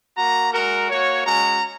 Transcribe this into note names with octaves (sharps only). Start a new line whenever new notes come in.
A#3 F#4 A#5
G#3 F#4 A#4
A#3 F#4 C#5
G#3 C#4 F#4 A#5